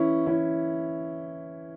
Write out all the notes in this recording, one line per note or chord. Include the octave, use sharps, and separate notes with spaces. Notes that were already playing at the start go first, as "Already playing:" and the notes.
Already playing: E3 C#4 E4
E3 C#4 E4